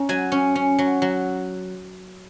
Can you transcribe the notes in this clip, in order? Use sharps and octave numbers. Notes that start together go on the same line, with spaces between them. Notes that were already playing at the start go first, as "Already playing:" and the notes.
Already playing: C#4 A#5
F#3 G#5
C#4
C#4
F#3
F#3